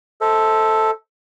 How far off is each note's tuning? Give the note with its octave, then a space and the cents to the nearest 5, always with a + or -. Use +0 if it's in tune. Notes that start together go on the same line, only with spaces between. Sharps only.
A4 +0 C5 +0 E5 -45